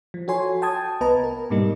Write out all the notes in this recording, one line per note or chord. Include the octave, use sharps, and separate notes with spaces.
F3
F#4 A4 C#5 G#5 C6
G5 A5 D#6 G#6
C2 B3 B4 D#5 A5 A#5
A#4
G#2 B2 G3 A#3 D#4